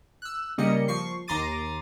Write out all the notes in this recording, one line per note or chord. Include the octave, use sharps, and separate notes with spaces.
E6 F#6
C#3 G3 A#3 D#5 C#7
F3 C#6 C7
D#2 A#5 C6 D6 A6 D#7